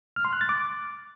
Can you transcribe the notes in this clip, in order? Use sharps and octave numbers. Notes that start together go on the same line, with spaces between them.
F6
C6
F#6
A6
D6